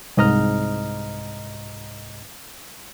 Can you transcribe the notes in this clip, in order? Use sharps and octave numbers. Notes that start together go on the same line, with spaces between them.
C2 G#2 D#5 A#5 F6